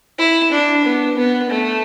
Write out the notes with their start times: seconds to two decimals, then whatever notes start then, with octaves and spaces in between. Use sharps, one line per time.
0.19 E4
0.52 D4
0.85 B3
1.18 B3
1.50 A3